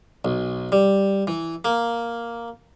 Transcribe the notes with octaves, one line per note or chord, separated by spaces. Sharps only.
B1
G3
E3
A#3